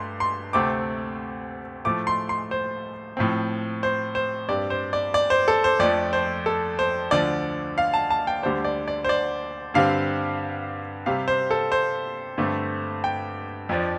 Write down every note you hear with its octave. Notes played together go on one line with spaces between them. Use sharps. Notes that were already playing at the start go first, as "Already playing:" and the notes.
Already playing: G2 A3 C6
C6
D2 C3 A3 C4 D6
A2 F3 A3 D6
C6
C6
C5
A2 F3 C4
C5
C5
G2 G3 C4 D5
C5
D5
D5
C5
A4
C5
F2 F3 A3 D4 D5
C5
A4
C5
D2 D3 F3 D4 D5
F5
A5
A5
G5
D2 D3 G3 D4 C5
D5
D5
C5
D5
G2 D3 G3 C4 F5
C3 G3 C4 F5
C5
A4
C5
G2 D3 A3 C4
G5
F2 F3 D4